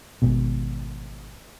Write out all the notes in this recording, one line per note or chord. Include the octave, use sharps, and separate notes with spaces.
G#1 G#2 B2